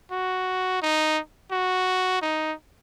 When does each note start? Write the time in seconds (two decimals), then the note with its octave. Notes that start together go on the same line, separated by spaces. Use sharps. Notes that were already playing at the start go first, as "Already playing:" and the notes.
0.11 F#4
0.82 D#4
1.51 F#4
2.22 D#4